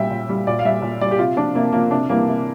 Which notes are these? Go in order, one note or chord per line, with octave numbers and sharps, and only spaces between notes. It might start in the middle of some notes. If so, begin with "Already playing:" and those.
Already playing: A#2 G3 E5 G5
A#2
G3
A#2 D5
F5
G3 E5
A#2
G3 D5
G4
C3 F4
F3 D4
C3 A#3
F3 A#3
C3 D4
E3 G3 A#3
C3